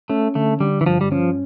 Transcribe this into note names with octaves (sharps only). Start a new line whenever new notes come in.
A3 C#4
D3 A3
D3 G3
E3
G2 F3
G3
F3 C#4